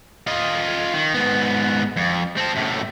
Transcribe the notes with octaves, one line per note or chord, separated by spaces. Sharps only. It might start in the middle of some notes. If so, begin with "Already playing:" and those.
F4 D#5
D#3
G#2 B3
F2
C4 A4
F#2 A2